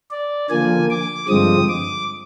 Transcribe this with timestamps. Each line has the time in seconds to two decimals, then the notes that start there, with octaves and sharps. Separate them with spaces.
0.11 D5
0.50 D3 F3 A#3 G#5
0.90 D6
1.28 G2 D3 F3 G#3 C4 D#6
1.68 D6